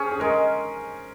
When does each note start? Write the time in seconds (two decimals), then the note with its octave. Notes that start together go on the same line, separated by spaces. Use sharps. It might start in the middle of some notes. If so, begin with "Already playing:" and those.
Already playing: C#4 G#4 C5
0.11 G#4
0.20 G#3 A#4